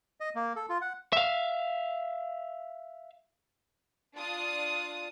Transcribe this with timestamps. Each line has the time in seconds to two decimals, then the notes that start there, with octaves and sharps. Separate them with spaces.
0.20 D#5
0.35 A#3
0.56 A4
0.69 F4
0.81 F#5
1.13 E5 F5
4.16 D4 F4 D#6